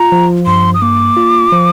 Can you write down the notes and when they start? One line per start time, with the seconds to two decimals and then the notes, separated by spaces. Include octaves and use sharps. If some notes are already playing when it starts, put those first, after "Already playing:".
Already playing: F4 A#5
0.12 F3
0.46 G2 C6
0.74 D#6
0.82 A#3 D6
1.17 F4
1.52 F3